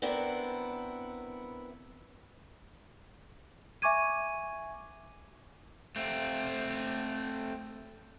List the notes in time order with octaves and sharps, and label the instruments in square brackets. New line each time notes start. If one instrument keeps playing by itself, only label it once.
[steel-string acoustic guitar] B3 C4 D4 E4 A#4
[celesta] E5 G#5 C#6 D6 G#6 D#7
[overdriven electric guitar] A3 C4